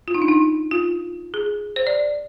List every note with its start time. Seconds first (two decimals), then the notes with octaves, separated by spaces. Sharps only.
0.08 F4
0.14 D#4
0.22 D4
0.28 D#4
0.71 F4
1.34 G#4
1.76 C5
1.87 D5